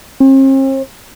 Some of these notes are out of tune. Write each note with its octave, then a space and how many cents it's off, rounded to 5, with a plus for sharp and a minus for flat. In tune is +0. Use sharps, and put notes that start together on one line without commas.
C4 +45